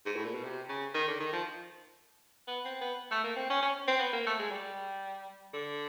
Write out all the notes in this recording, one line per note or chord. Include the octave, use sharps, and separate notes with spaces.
G#2
A2
A#2
B2
C3
C#3
D#3
D3
D#3
F3
B3
C4
B3
A3
A#3
C4
C#4
C#4
C4
B3
A#3
A3
G#3
G3
D3